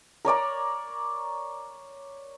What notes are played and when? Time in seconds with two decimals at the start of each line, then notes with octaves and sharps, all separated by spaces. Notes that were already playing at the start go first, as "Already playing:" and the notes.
0.25 A#4 C#5 D5 A#5